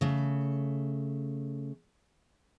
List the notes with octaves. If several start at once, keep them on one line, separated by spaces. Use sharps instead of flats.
C#3 A3